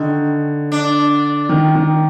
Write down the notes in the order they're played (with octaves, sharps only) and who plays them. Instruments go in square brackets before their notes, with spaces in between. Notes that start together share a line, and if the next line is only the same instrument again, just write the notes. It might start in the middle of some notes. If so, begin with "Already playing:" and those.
Already playing: [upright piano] D3 [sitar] D#3
[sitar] D4
[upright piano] D#3
D#3